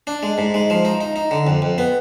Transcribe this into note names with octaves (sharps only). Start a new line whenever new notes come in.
D4
G#3
G#2
G#3
F3
D#4
D#4
D#4
D3
F2
F2
B3